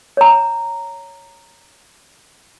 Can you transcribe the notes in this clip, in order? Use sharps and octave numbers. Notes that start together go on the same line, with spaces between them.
C#5 A#5